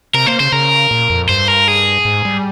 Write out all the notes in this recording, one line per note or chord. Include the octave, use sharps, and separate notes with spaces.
C3 A#4
A#3 C5
C#3 C5
C#3 A#4
A#2
F2
G2 C5
A#4
G#4
G#2
G3